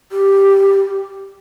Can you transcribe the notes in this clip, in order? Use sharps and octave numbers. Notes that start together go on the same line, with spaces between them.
G4